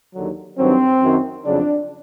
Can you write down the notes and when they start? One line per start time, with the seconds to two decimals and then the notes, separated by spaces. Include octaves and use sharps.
0.15 D#2 D3 F#3
0.58 G2 D#3 F#3 C4
1.01 F#2 D#3 F#3
1.45 F2 C#3 F#3 D4